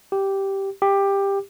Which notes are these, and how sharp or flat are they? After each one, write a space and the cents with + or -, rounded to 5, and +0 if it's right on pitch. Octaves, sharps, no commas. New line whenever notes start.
G4 -5
G4 +15